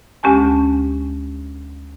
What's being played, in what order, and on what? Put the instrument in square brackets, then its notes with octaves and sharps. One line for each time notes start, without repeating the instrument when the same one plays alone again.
[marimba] D2 G#3 C#4 G4 G#5 A5